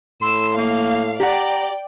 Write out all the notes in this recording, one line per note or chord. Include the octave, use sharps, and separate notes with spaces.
A2 C6 E6
A#3 F5
G4 D5 F#5 G5 A#5